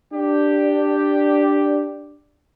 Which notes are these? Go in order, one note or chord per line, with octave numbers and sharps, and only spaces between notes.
D4 G4